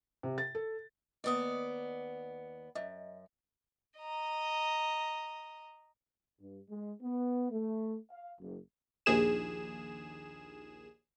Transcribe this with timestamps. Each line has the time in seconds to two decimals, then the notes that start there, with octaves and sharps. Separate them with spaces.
0.23 C3
0.38 A6
0.55 A4
1.24 D#2 B3 D5 D#5 D#6
2.75 F#2 D#5 E5
3.98 D#5 A#5
6.40 G2
6.70 G#3
7.02 B3
7.51 A3
8.10 F5
8.40 F#1
9.06 A#1 D#2 G#4 E7